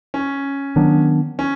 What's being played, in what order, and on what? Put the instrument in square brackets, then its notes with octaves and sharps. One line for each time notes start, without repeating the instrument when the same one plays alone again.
[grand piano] C#4
[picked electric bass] D#3 F#3 B3 D4
[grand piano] C#4